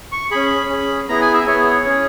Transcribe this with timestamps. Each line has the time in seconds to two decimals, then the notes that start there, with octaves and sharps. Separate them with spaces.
0.12 C#6
0.31 C#4 G#4 B5
0.69 C#4 G#4
1.09 B3 E4 G#4 A#5
1.21 G#5
1.33 E5
1.47 B3 E4 G#4 C#5
1.85 C#4 G#4